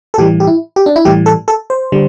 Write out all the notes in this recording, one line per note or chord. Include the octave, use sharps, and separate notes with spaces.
A4
A2 E3 G3 G4
G4
E4
G4
D4
E4
A2 E3 G3 G4
A4
A4
C5
D3 G3